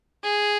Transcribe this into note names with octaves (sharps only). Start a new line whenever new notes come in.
G#4